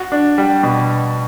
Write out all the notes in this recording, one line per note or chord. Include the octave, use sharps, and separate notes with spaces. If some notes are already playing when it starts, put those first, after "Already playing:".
Already playing: F#4
D4
G3
B2